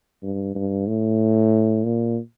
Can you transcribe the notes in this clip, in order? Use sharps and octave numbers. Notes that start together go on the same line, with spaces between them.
G2
G2
A2
A#2